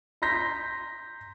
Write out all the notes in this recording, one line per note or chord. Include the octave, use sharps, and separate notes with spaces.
A#5 C6 G6 A#6 B6